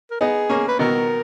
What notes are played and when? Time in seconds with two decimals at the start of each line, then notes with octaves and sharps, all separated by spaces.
0.11 A#4
0.21 B3 D#4 G#4
0.49 A#3 C#4
0.68 B4
0.79 B2 D#3 A#4